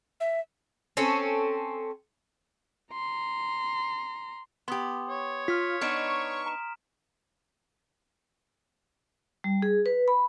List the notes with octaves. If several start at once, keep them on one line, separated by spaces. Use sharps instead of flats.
E5
C4 C#4 A4
A#5 C6
B3 G4 C6 D#6
C#5
F4 F6 B6
B3 D4 D#4 C#6 F6 D7 E7
A#5 E7
G3
G#4
B4
B5